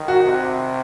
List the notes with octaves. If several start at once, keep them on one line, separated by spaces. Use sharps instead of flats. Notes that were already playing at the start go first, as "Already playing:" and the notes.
Already playing: D#3
F#4
C3